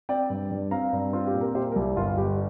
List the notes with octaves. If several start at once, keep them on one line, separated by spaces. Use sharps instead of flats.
C4 D5 G5
G2
G2
C4 F5 A#5
G2
C4 F4
G4
A#2
A#4
A#2 G4 C5
A#4
C2 G4
G1 F4
G1 G4